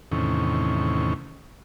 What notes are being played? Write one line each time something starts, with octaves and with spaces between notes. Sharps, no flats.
E2 A2 C3 D#3 C#4